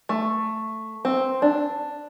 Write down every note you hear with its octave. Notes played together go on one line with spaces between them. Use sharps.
A3
C4
D4